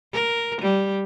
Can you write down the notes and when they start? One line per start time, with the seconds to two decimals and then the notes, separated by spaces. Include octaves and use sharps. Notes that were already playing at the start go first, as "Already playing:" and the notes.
0.13 A#4
0.62 G3